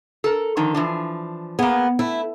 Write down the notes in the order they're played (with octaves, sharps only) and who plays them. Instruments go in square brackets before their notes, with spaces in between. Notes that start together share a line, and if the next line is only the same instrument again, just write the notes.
[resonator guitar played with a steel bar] A4 A#4
D3 D#3 F3
E3 F3 D4
[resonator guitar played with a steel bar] A#3 G#4 [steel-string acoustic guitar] B3
[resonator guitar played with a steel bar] A3 [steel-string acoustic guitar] E4